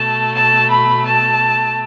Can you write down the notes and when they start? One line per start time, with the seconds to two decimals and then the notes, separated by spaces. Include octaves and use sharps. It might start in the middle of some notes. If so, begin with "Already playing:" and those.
Already playing: B2 A3 A5
0.34 A5
0.70 B5
1.05 A5